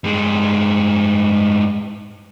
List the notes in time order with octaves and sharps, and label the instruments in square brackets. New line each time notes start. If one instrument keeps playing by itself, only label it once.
[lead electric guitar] G2 G#3